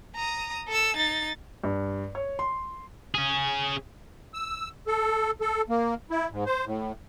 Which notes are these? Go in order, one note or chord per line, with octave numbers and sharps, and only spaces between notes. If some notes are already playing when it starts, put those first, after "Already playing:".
A#5 D#6
A4 E6
D#4 A6
G2
C#5
C6
C#4 G#4
E6
A4
A4
A#3
E4
G#2
C5
A2